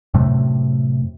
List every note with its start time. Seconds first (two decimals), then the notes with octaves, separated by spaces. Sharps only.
0.14 F#2 A2 C3 A3